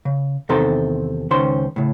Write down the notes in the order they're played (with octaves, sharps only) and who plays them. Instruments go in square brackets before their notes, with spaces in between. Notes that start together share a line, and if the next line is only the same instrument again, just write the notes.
[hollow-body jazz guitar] C#3
E2 C3 D#3 A4 C5 A#5
C#2 D#3 C#4 C5 C6
A2 C#3